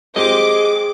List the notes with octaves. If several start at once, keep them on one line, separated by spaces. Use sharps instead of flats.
G#3 C4 G4 G#4 D#5 D6